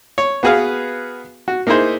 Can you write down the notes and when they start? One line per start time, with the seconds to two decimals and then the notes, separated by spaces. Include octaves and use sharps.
0.18 C#5
0.43 B3 F#4 G#4 B4 F5
1.48 F#4
1.67 A#3 D#4 E4 G#4 C5